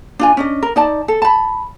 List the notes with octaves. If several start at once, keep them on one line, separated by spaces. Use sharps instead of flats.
D4 F4 G#5
C#4 D4 D#5
A#4
D#4 D5 A5
A4
A5 B5